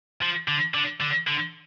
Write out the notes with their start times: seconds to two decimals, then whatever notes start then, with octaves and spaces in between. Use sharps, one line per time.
0.22 F3
0.48 D3
0.74 D3
1.01 D3
1.27 D3